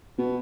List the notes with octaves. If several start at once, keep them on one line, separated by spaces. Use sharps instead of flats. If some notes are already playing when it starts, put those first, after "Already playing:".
B2